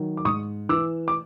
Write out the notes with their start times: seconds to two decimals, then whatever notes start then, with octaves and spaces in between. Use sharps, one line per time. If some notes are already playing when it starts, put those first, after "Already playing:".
Already playing: D#3 F#3
0.17 D6
0.25 G#2 C#6 D#6
0.69 E3 D6 E6
1.08 D6